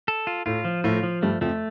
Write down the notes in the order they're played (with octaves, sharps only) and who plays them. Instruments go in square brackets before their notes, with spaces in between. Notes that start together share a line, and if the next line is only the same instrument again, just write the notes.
[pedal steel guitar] A4
F4
[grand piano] A2 A3 [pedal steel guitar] F4
[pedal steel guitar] F3
[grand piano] A2 A3 [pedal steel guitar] F4
[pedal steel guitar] F3
[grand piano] G2 G3 [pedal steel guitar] A3
[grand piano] F2 F3 [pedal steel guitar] A3